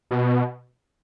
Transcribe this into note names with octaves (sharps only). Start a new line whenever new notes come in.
B2